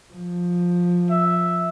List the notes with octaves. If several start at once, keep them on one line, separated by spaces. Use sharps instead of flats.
F3
E5